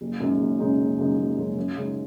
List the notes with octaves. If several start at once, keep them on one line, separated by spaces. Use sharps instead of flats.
F#1
F#2 C#3 G#3 D#4
F#1
F#2 C#3 G#3 D#4
F#1
F#2 C#3 G#3 D#4
F#1
F#2 C#3 G#3 D#4
F#2
C#3 G#3 D#4